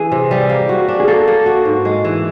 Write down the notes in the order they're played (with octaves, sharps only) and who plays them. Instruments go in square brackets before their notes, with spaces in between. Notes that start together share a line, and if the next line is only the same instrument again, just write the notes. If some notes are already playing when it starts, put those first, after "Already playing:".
Already playing: [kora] E3 [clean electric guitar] G#4
[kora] C3
G3
A#3
F#4
D4
[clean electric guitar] G#4
[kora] A#3 [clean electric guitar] A4
[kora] A#3
F#4
G#2
G#3
E3